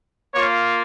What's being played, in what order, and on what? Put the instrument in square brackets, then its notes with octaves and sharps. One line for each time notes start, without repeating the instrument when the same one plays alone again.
[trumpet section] A#3 F4 C#5